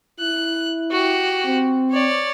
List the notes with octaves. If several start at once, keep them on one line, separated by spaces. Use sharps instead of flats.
E4 F#6
F#4 G4
C4
C#5 D5